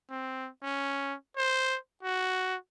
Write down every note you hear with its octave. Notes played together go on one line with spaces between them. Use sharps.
C4
C#4
C5
F#4